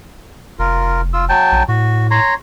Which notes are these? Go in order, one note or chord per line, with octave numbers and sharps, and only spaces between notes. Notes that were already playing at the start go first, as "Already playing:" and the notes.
F1 F4 A#4
F4 E6
F#3 G5 A5
A#1
A2 F#4
C#5 A#5 C6